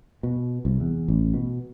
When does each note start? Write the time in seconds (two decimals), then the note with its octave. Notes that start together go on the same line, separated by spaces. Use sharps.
0.23 B2
0.65 C2
0.80 E2
1.08 A1
1.34 B2